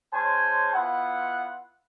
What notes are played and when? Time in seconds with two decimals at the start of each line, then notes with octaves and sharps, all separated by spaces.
0.13 G#3 C#4 C5 C#5 G#5 A5
0.74 B3 E4 F4 F#5